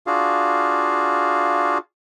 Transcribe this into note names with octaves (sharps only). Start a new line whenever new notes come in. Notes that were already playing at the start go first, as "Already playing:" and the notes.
D4 F4 F#4 G#4 F5